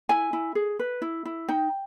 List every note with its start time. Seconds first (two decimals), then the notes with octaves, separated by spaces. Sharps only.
0.09 E4 G#5
0.33 E4
0.55 G#4
0.79 B4
1.02 E4
1.25 E4
1.49 D#4 G5